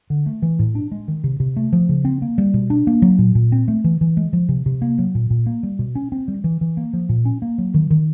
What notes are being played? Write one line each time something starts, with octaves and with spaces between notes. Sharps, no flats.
D3
A3
E3
A2
D4
G#3
D#3
C3
C3
A3
F3
C#3
C4
A#3
G3
B2
D4
A#3
F#3
A#2
A#2
C4
A3
E3
E3
G#3
F3
C3
C3
A#3
F#3
A#2
A#2
A#3
G3
B2
C#4
C4
G3
E3
E3
A#3
F3
A#2
C#4
A#3
F#3
D#3
D#3